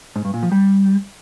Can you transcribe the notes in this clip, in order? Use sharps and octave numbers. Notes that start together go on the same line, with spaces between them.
G#2
G2
A#2
F3
G3